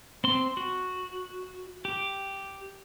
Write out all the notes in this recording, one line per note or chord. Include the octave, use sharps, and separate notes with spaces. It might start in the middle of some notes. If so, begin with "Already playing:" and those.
C4 C6
F#4
G4